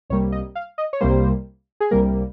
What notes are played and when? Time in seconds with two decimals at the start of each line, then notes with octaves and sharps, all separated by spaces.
0.10 C2 C3 G3 A#3 C#5
0.32 D#5
0.55 F5
0.78 D#5
0.93 C#5
1.01 C2 C3 G3 A#3 C5
1.80 G#4
1.91 C2 C3 G3 A#3 A#4